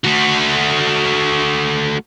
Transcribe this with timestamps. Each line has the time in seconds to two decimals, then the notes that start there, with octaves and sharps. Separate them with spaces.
0.05 A3 F#4